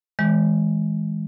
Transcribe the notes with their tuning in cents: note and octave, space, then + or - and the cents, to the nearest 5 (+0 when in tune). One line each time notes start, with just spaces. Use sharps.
E3 -35 G#3 +0